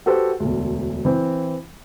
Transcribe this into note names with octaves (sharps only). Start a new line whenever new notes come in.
F#4 G4 A4 B4 C5
E1 D2
E3 C4